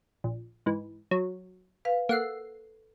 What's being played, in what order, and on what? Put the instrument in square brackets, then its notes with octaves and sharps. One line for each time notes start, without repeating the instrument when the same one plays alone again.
[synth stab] A#1
G#2 E3
F#3
[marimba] B4 F5
[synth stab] A#3 F#5 C7 [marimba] A4 E6